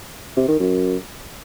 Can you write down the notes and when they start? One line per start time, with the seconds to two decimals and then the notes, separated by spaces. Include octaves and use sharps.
0.37 C3
0.48 D#3
0.59 F#2